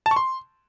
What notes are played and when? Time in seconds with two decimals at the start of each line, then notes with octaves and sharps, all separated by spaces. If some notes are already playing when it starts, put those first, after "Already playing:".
0.06 A5
0.11 C#6
0.16 C6